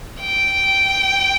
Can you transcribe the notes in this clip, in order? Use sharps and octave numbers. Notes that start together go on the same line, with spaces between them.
G5